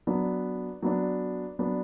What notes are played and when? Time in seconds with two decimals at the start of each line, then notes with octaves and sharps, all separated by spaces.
0.07 F#3 B3 D4
0.82 F#3 B3 D4
1.59 F#3 B3 D4